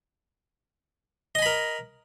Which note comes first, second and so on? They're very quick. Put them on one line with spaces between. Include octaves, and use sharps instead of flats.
D#5 G#5 B5 A#4